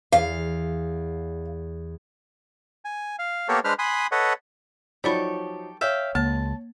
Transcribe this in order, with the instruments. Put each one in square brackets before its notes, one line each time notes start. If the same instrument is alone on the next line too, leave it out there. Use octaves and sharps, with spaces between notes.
[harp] E2 [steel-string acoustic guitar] F5
[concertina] G#5
F5
A#3 B3 G4 A4 A#4 C#5
G#3 D4 B4 C5 F6
G#5 B5 C6 D#6 F#6
A4 B4 C#5 D#5 F#5
[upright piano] F3 F#3 D#4 [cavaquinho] G4 A4 C#6 [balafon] D5 B5
[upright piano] C#5 [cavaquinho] E5 F5 G5
[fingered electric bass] C#2 [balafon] A#3 [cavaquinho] A5